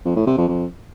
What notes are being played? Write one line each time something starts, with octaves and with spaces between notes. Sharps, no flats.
F2
A2
C3
F2
F2